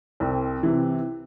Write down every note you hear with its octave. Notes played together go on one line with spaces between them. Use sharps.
C2 C4
C3 E3